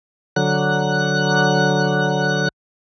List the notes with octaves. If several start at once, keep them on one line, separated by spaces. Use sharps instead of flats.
D3 F#3 F#6